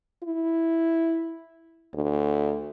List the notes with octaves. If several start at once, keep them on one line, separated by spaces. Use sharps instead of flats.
E4
D2